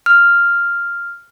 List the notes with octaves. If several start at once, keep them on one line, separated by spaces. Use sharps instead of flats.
F6